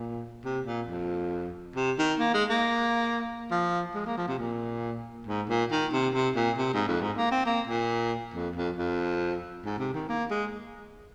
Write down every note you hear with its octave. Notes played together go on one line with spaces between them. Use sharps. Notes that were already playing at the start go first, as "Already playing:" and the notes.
Already playing: A#2
C3
A#2
F2
C3
D#3
A#3
G#3
A#3
F3
G#3
A#3
F3
C3
A#2
G#2
A#2
D#3
C3
C3
A#2
C3
G#2
F2
G#2
A#3
C4
A#3
A#2
F2
F2
F2
G#2
C3
D#3
A#3
G#3